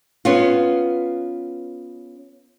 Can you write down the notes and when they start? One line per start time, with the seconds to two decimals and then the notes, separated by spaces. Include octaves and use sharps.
0.25 B3 C#4 F4